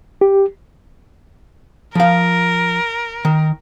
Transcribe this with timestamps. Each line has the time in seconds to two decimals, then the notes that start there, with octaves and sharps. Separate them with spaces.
0.21 G4
1.95 F3 A#4 F5
3.25 D#3